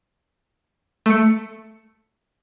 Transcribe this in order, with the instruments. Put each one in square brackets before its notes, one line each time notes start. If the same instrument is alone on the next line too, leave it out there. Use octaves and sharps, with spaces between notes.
[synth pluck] A3 C#7